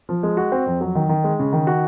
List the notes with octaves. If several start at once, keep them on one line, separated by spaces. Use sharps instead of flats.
F3
G#3
F#4
C4
F2
F#3
D#3
D#3
G#3
C#3
D#3
F#4